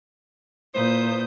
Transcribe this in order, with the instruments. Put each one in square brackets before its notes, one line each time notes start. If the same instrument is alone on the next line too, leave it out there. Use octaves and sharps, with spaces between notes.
[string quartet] A#2 D#6 G6 [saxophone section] E4 B4 C5